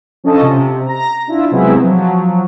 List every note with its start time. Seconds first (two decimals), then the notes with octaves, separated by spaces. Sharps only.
0.24 F3 C#4 D4 A4 D#5 A5
0.41 C3
0.86 A#5 A#6
1.27 D4 E4 F4
1.51 C3 F#3 G#3 B3 C4 E4
1.83 F3 F#3